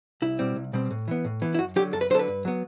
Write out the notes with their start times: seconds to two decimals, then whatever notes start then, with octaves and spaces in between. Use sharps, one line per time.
0.22 C2 E4
0.39 B2 G3 C4
0.56 C2
0.73 B2 G3 C4
0.91 A2
1.08 E3 B3
1.25 A2
1.42 E3 B3
1.54 E4
1.58 F#2 F#4
1.76 F#3 G4
1.79 D3
1.93 F#2 A4
2.01 B4
2.10 D3 F#3 C5
2.15 A4
2.19 B4
2.28 G2
2.45 F#3 B3